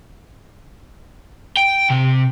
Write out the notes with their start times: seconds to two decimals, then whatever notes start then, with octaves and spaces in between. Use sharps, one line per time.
1.57 G5
1.91 C3